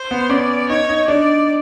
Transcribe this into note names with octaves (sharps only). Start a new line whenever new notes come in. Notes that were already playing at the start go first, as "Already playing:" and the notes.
Already playing: C5
B3
C#4 D5
D#4 C#5
D#4
D4 D5